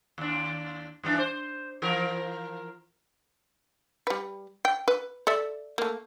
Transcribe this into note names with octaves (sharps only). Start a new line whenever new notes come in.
D#2 D4
G2 E3 D4
C5
E3 F3 A#4
G3 B4
G5
B4
A4 D5 E5
A3 A#3